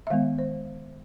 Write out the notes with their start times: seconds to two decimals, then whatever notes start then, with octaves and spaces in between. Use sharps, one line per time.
0.07 E5
0.10 D#3 G#3 B3 F5
0.38 C5